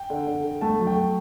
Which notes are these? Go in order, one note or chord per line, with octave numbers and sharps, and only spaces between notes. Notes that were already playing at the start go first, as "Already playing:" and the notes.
Already playing: G5
D3
D3
D3
A3 A5
F#3
G5
A3